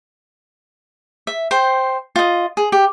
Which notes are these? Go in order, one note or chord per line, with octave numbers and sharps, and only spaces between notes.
E5
C5 G5
F4 D#5
G#4
G4